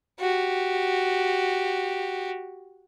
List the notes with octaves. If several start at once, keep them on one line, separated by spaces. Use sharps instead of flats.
F#4 G4